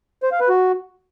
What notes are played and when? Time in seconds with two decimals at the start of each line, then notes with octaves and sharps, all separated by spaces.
0.23 C5
0.32 F5
0.40 B4
0.49 F#4